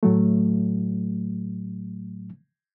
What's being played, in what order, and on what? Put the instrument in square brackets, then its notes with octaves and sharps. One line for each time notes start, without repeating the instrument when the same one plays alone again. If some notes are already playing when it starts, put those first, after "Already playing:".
[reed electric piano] A2 F#3 A3